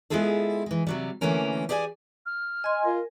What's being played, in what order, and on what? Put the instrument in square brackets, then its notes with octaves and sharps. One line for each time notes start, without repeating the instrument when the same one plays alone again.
[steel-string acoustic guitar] G#3 B3 E4 F4 G#4 A4
E3 G#3
C3 F#3 G3
D3 E3 A3 A#3 C#4 A#4
G4 G#4 D5 E5 G#5
[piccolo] F6
[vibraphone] D#5 C6 [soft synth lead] G#5
[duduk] F4 [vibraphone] A#4